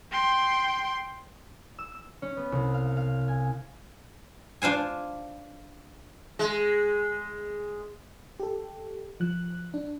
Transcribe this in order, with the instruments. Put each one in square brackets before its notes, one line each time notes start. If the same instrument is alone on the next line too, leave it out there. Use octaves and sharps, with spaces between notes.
[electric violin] G5 C6
[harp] E6
E6
C#4
B3
C2
F5
F5
G#5
[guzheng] D4 F4 C5 G#5
[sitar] G#3
[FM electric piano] G4 A4
F3 F#6
D4